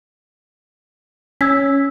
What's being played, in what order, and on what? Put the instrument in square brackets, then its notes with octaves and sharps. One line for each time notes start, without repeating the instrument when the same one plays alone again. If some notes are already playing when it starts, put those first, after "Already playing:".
[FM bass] C#4 [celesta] E6 G#6 B6